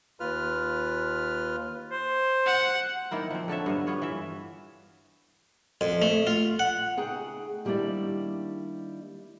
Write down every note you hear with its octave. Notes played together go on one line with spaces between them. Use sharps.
D#2 F4 B4 F6
C5
F#5
D#3 A#3 E4 A#4
F3 C4
D3 A4 C#5 E5
G2 B3 F5
B3 F4 C#5
E3 E5
F2
A3
F4
F#5
C#3 A3 D#4 G#4 F#5 G5
D#3 G3 A#3 D4 E4 D5